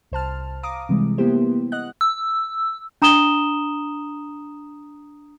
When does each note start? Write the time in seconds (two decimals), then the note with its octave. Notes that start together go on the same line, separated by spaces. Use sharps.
0.12 C2 C5 A5 F6
0.63 F5 A#5 D6 D#6
0.89 C3 E3 G3 G#3
1.18 A#3 B3 E4 G4 C5
1.72 D#5 F#5 F#6
2.01 E6
3.02 D4 A#5 D#6 E7 G7